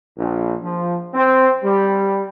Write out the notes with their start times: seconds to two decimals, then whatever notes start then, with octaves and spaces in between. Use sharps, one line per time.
0.18 A#1
0.63 F3
1.14 C4
1.63 G3